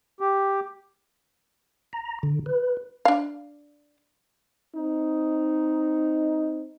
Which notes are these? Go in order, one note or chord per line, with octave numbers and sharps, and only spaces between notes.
G4
A#5
D3
B4
D4 F5
C4 D#4